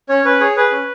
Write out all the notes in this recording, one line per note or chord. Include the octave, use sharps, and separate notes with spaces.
C#4 C#5
C#4 B4
G#4 C#5
G#4 B4
C#4